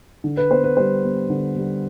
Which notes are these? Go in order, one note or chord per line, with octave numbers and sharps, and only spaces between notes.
D3
B4
B3 C5
B4
G3 C5
B3
D3
G3